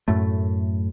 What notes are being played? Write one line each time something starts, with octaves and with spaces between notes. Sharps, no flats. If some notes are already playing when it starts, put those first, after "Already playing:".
F#2 A2 A3